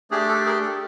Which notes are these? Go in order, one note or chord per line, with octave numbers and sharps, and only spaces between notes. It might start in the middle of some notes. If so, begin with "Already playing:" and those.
A3 D4 G4 G#4
A4
G#4 A#4
A4